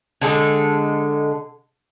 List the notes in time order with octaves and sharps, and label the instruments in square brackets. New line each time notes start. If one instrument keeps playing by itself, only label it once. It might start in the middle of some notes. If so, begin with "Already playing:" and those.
[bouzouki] D3 G#3 A4